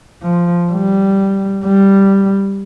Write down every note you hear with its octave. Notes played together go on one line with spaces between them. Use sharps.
F3
G3
G3